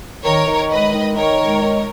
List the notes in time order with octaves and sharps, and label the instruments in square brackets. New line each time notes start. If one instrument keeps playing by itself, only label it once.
[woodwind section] D#3 [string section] A#4 C#5
[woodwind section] D#3
[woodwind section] G#3 [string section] B4 D#5
[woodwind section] D#3
[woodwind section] D#3 [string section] A#4 C#5
[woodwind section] G#3
D#3